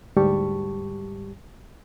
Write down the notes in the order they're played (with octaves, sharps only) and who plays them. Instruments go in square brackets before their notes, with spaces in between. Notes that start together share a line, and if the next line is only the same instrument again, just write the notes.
[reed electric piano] D2 G#2 G3 G4 A5 C#6